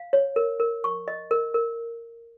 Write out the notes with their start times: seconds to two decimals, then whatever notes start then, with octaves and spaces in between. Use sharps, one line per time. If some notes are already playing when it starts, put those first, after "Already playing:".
Already playing: F5
0.13 C#5
0.36 A#4
0.60 A#4
0.84 C#6
1.08 D#5
1.31 A#4
1.54 A#4